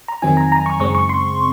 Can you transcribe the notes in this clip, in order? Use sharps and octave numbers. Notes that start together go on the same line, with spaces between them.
A#5
F2 D#3 F#3 C4 D#4 G#5
A#5
A#5
C#6
F#2 C#3 G#3 C4 C#6
C#6
C6